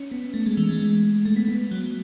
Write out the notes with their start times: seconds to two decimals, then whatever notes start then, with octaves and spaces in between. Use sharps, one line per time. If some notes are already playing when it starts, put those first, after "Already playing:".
Already playing: C#4
0.11 B3
0.34 A3
0.46 G#3
0.57 E3
0.69 G#3
1.25 A3
1.36 B3
1.48 B3
1.71 F#3